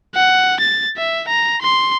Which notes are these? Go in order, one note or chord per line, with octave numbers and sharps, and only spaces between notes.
F#5
A6
E5
A#5
C6